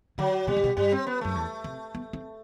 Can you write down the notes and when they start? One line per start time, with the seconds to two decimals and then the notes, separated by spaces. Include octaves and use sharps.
0.18 D3 F#3
0.47 B2 G3
0.57 A2
0.64 B2
0.77 G2 G3
0.92 C4
1.07 B3
1.21 F#2 A3
1.35 E2
1.64 C3
1.95 B3
2.13 C4